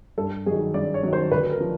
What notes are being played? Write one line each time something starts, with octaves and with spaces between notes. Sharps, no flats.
G2 A4
D#3 F#3 G#4
G2 D5
C#5
D#3 F#3
C5
D2 B4
A#4
F3